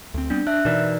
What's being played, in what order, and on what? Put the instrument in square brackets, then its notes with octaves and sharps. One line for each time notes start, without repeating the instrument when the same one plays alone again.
[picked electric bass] D2 C4
[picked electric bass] G3 B3 C4 [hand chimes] D4
[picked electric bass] D4 [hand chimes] E5 F#6
[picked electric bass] B2 E3 [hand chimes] D#4 A#4 D5